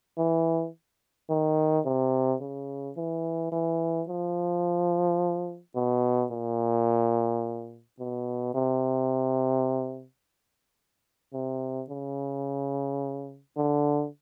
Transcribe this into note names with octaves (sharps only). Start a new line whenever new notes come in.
E3
D#3
C3
C#3
E3
E3
F3
B2
A#2
B2
C3
C3
C#3
D3